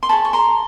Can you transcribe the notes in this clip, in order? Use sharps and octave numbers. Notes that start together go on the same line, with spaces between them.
C6
G#4 C#5 A5 B5
C#6
A#5 C6